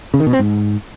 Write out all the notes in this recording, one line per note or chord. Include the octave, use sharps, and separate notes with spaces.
C#3
D#3
B2
C4
G#2